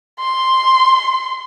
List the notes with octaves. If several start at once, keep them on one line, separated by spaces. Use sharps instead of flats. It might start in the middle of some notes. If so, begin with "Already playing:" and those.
C6